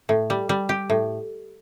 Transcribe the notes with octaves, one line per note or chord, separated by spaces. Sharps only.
A2
G3
G3
G4
A2